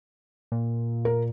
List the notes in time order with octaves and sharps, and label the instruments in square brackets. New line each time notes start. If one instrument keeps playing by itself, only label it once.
[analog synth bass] A#2
[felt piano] A#4